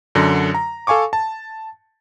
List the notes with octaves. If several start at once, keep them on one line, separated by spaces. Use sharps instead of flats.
F#2 D3 A#6
A#5
A4 F5 G#5 C#6 D6
A5